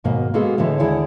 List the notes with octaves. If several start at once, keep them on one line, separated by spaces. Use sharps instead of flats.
D#2 G#2 B2 A#3
G#3 A#3 B3 F#4 G#4 A4
A2 D3 E3 G#3
D#2 D3 E4 G#4 D5 F#5